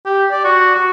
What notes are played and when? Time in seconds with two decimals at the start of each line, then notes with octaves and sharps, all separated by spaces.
0.06 G4
0.31 D5
0.45 F#4
0.76 F#4